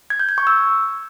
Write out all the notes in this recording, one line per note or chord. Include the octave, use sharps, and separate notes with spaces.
G#6
G6
G#6
C#6
E6